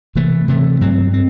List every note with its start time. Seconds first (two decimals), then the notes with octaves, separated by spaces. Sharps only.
0.15 C3 E3 A3
0.48 C3 E3 A3
0.81 G2 F#3 C4
1.13 C4